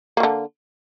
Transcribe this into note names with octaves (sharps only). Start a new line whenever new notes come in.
D3 F#3 A#3